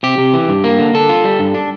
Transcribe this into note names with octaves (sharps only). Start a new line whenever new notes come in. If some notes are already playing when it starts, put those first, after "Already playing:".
C3 G4
C3
E3
G2
A#3
D3
D3 A4
F4
G3
G2
D4